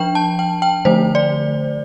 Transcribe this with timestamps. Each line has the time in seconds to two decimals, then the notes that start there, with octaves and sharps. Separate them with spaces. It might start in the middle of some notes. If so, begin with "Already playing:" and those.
Already playing: F3 D4 G5
0.15 A5
0.39 G5
0.62 G5
0.85 D3 F3 A3 C5
1.15 D5